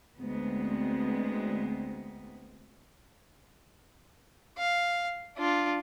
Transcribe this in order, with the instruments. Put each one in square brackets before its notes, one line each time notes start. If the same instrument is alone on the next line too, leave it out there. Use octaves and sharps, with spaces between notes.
[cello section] D2 G#3 B3 C4
[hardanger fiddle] F5
D4 F4